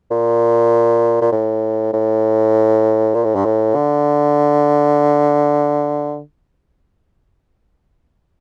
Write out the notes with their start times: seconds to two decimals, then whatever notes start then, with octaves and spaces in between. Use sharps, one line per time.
0.11 A#2
1.21 A#2
1.32 A2
1.93 A2
3.14 A#2
3.24 A2
3.35 G2
3.45 A2
3.75 D3